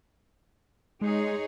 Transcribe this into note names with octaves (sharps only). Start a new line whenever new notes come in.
G#3 D#4 G#4 C#5